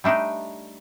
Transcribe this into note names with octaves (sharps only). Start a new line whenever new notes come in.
G3 A3 D4 D#4 G4